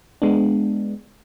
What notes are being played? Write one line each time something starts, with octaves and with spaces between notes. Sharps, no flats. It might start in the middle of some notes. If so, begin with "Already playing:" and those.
G#3 B3 D4